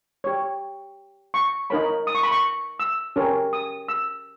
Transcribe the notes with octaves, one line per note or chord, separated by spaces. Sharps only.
G4 C#5
C#6
D#4 A#4 C#5 B5
D#6
C#6
B5
C#6
E6
C#4 G4 A#4 C#5
D#6
E6